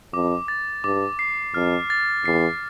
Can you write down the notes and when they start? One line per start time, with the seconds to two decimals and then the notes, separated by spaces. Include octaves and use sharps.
0.13 F2 D6
0.48 A6
0.84 G2 D6
1.19 C7
1.54 F2 F6
1.90 A6
2.25 E2 C7